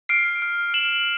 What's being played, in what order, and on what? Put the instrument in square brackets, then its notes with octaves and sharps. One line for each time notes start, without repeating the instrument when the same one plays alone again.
[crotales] F6 C7 D7
F6
F6 E7 F#7